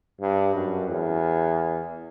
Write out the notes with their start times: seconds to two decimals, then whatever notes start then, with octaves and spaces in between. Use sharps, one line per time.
0.21 G2
0.55 F#2
0.89 E2